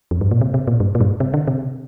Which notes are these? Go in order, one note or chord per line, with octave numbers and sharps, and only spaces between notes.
F2
G2
A#2
C3
C3
A#2
G2
A#2
G2
C3
D3
C3